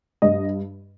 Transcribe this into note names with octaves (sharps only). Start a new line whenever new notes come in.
G2 D#5